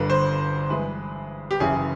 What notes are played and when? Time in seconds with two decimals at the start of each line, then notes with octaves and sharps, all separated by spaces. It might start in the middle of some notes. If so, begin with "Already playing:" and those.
Already playing: G1 G2 D3 B4
0.10 C5
0.69 G2 E3 G#3 B4
1.51 G4
1.60 F#1 F#2 C#3 E3 G#4